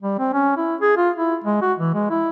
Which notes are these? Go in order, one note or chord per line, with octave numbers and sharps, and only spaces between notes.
G3
C4
C#4
E4
G#4
F4
E4
G#3
F#4
E3
G#3
E4